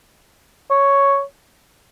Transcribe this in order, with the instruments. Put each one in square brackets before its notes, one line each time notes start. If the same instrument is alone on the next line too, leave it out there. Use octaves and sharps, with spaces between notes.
[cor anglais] C#5